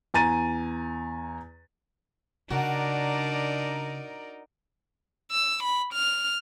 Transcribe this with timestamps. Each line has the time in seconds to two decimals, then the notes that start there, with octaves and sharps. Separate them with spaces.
0.14 E2 G#5 A#5 A6 D#7
2.50 C#3 D4 D#4 F#4 A#4 D5
5.31 E6
5.63 B5
5.93 F6